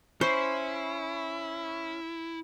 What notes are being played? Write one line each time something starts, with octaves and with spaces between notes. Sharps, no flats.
C#4 E4 C5 B5 C#6 C7